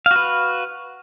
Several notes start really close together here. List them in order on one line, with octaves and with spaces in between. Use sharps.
F5 F#4 B4